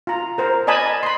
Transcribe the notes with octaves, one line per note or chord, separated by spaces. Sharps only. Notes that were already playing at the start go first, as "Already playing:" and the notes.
F4 A#5
A#4 C5 A#5
D5 D#5 G#5 A5 B5
B5 C6